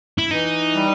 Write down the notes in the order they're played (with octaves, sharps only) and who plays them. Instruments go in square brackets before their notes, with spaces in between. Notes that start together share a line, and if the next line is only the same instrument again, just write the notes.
[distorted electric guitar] E4
[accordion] E3 [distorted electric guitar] D#4
[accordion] G3